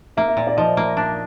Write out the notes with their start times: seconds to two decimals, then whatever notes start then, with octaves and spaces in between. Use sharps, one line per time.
0.17 A#3 E5
0.28 E5
0.37 A#2
0.47 D5
0.57 F3 D#5
0.77 A#3
0.97 D4